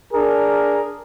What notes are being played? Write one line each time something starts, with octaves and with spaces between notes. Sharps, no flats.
D4 G#4 A#4